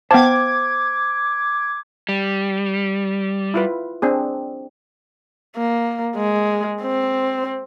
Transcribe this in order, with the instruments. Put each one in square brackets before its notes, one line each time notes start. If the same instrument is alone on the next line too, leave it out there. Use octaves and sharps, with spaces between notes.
[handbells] B3 A5 [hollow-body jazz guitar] C5 F5 G5 [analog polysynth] D6 G#6
[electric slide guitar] G3
[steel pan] E4 F4 B4
C4 D4 G#4
[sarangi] A#3
G#3
C4